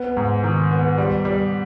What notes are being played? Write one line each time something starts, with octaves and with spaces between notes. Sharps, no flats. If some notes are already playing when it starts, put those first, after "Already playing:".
Already playing: B3
G#2
D#3
B3
G3
G3